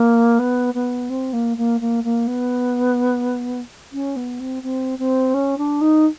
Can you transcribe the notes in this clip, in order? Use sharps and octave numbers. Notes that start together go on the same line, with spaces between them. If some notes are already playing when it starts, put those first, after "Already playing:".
Already playing: A#3
B3
B3
C4
A#3
A#3
A#3
A#3
B3
C#4
B3
C4
C4
C4
C#4
D4
D#4